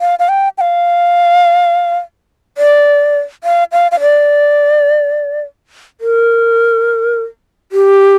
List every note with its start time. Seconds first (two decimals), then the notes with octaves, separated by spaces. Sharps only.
0.01 F5
0.19 F5
0.29 G5
0.58 G5
0.61 F5
2.58 D5
3.44 F5
3.72 F5
3.92 F5
4.01 D5
6.01 A#4
7.72 G4